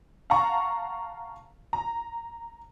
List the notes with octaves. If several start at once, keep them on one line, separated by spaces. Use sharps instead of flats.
F5 F#5 A5 A#5 C#6
A#5